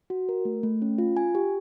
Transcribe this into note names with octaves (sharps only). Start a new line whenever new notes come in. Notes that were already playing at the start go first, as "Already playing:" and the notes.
F#4
A#4
A3
A3
C#4
F4
G#5
G4